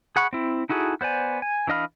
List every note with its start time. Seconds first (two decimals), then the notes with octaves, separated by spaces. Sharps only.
0.16 G#4 F#5 B5 C#6
0.33 C4 E4
0.69 D#4 E4 F#4 G#4 A4
1.01 B3 C5 D5 G#5
1.42 G#5
1.67 E3 D4 D#5 F5 B5